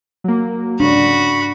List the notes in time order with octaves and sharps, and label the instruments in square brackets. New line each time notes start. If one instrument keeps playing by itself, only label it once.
[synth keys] F#3 A#3
[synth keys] G#2 C#3 [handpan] D4 [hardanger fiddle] F#4 B5